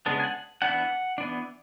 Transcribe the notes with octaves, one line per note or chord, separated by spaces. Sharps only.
C#3 G#3 B3 D4
G#5
F#5
E3 B3 D4 F#5
E3 B3 D4